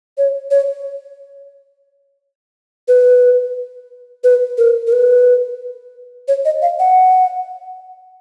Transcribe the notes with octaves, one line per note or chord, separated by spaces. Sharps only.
C#5
C#5
B4
B4
A#4
A#4
B4
C#5
D#5
F5
F#5